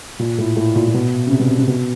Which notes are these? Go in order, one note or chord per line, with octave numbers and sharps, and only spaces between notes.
A#2
A2
A2
A#2
A#2
B2
C#3
C3
B2
C3
C3
B2